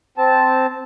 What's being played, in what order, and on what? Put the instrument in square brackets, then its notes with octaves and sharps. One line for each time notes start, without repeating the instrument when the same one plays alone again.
[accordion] C4 A5